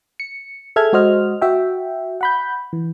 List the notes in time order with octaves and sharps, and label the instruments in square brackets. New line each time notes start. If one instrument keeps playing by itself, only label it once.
[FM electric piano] C#7
G#4 A4 E5 A5 F6 G#6
G#3 F#4 C5 D#5 F6
F#4 E5 G5
F#5 B5 G6
E3